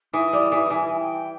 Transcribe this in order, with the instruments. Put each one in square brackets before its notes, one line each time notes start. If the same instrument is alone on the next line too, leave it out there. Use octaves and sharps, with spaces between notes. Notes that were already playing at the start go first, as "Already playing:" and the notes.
[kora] E3 [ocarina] D#6
[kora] G3
E3
[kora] E3 [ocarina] G#5
[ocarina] G5